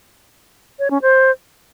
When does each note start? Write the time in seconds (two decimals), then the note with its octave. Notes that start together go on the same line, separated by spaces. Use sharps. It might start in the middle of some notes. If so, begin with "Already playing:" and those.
0.79 C#5
0.91 C#4
1.02 C5